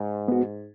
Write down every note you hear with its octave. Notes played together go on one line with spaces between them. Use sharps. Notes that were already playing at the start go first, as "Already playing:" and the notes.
Already playing: G#2
B3 F#4